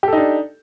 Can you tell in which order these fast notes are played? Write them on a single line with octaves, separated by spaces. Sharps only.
G4 A4 D#4 D4